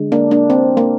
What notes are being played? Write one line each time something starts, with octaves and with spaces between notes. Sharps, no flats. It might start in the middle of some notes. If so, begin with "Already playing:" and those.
Already playing: D3 G#3
A#3 D4
A#3 D4
C4
A#3